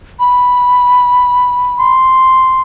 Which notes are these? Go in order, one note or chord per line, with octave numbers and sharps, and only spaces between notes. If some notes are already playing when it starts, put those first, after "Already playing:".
B5
C6